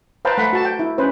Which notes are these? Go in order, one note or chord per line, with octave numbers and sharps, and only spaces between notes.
B4 C5 F5 G5 A5 A#5
A3 F#5 B5
F#4 A5
G5
E4
C#4 B4 C5